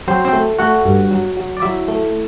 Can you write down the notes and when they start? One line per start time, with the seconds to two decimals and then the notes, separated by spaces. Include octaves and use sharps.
0.08 F#3 C4 C5
0.25 C4 C5
0.33 A3
0.59 A3 F#4 F#5
0.85 G2
1.11 F#3
1.37 F#3
1.57 D5
1.62 F#3 E4 E5
1.88 A3